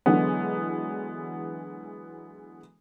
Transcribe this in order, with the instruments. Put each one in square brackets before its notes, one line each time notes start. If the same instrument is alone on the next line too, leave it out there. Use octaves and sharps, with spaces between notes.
[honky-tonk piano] D3 E3 F#3 G#3 B3